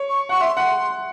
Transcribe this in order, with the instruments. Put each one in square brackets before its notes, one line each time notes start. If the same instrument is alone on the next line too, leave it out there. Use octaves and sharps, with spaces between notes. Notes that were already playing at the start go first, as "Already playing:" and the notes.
Already playing: [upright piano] C#5
[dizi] C#6
[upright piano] F#5 [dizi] C#6
[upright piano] E5 [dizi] C6
[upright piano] F#5 [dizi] C6